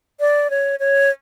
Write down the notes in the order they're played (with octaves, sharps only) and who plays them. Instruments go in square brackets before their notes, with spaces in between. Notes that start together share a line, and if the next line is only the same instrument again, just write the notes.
[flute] D5
C#5
C#5